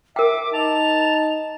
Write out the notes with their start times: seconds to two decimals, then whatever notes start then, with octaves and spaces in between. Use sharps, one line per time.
0.16 A#4 E5 G5 D6
0.54 D#4 A5 F7